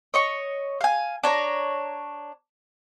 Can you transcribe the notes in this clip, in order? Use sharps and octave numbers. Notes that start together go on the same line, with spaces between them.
C#5 D#5 C#6
F5 G#5
D4 C#5 A#5